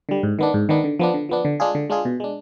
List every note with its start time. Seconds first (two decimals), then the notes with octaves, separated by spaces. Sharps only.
0.09 D3 G3
0.23 G#2
0.39 D#3 B3 D4
0.54 G#2
0.69 D#3 B3 D4
0.84 D3
0.99 F3 B3 D4
1.14 D3
1.29 F3 B3 D4
1.45 D3
1.60 G#3 D4 F4 G#4
1.75 D3
1.90 G#3 D4 F4 G#4
2.05 B2
2.20 G#3 D4